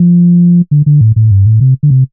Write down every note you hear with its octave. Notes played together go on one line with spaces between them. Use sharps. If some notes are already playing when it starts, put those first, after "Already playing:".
Already playing: F3
D3
D3
A2
A2
G2
A2
C3
D3
C3